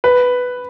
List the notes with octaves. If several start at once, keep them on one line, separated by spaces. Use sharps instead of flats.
B4